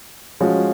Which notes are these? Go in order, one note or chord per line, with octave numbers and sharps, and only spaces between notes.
F3 G#3 C#4 F#4